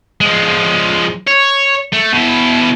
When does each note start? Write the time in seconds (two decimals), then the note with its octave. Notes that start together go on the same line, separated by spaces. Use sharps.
0.21 F3 G#3
1.27 C#5
1.92 A3
2.13 B2 E4